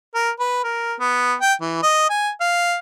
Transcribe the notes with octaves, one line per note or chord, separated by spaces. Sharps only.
A#4
B4
A#4
B3
G5
E3
D#5
G#5
F5